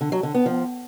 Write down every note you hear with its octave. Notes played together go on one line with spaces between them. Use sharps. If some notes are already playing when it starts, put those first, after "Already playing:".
D3
F#3
D3
B3
F3